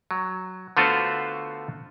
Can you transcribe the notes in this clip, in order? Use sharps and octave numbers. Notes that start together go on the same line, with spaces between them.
F#3
D3 A3 B3 F4 F#4 C5